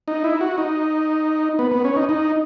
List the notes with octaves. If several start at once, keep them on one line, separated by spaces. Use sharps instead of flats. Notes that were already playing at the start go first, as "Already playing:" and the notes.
D#4
E4
F#4
D#4
B3
B3
C#4
D#4
D#4